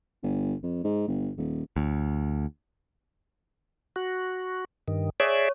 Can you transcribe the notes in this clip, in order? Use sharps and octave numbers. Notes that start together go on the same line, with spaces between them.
G1
F2
G#2
G1
D#1
D2
F#4
G2 D#3
G#4 C#5 D5 E5